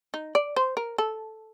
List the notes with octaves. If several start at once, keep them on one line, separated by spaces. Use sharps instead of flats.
D#4
D5
C5
A#4
A4